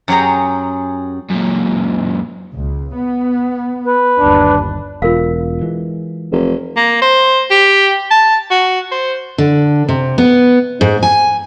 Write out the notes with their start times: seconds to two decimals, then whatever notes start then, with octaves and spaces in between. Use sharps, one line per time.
0.08 F#2 F#3 G4 G#4 A#5
1.30 F#2 A#2
2.55 C#2
2.95 B3
3.85 B4
4.19 G1 D#2 D4
5.02 E1 F4 A#4 F5
5.61 E3 G#3
6.32 F1
6.77 A#3
7.02 C5
7.51 G4
8.11 A5
8.51 F#4
8.92 C5
9.38 D3
9.89 C3
10.18 B3
10.81 G#2
11.03 G#5